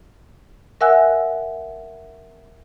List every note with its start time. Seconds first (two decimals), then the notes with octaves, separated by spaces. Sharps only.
0.81 A#4 E5 F#5 G#5 E6 F#6